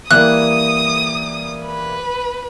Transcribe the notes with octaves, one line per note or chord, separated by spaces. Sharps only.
E3 G3 A#3 D#6 F#6
B4